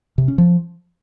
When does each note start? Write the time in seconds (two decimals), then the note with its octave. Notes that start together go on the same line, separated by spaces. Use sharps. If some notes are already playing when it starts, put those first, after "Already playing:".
0.18 C3
0.28 C#4
0.38 F3